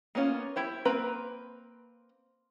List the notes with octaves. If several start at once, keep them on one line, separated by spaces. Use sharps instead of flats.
A#3 B3 C#4 F4
E4 G4 C5
A#3 C4 B4 A#5